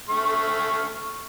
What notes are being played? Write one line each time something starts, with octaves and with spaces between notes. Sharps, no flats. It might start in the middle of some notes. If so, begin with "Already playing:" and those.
A3 C#6 F6